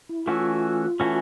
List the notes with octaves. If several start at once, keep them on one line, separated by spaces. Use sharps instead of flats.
E4
E3 A3 C#4 F4 F#4
E3 A3 C#4 F#4